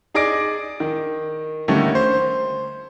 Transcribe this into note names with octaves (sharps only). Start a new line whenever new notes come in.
D#4 G#4 D5 D6 A#6 D7
D#3
D3 D#3 G3 A3 A#3 C#4
C5